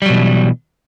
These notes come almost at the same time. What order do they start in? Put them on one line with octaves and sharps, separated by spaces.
G3 F#3 B2 E3